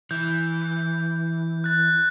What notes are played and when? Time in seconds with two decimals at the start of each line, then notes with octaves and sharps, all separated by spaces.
0.11 E3 G6
1.64 F#6 A6